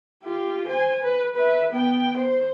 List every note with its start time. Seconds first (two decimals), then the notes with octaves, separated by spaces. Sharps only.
0.24 F4 G4
0.67 C5 G#5
1.02 B4
1.35 B4 E5
1.71 B3 G5
2.17 C5